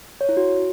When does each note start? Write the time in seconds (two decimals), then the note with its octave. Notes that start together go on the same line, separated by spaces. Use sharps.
0.21 C#5
0.29 E4
0.37 F#4